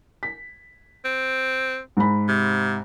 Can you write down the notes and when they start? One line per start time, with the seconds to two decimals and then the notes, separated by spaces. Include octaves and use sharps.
0.23 B6
1.05 C4
1.97 G#2 B5
2.28 C3